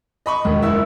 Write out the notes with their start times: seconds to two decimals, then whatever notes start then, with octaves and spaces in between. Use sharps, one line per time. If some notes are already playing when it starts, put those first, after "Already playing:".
0.26 D#5 B5 C#6
0.45 E1 D#2 G#3
0.62 F#1 E4 E6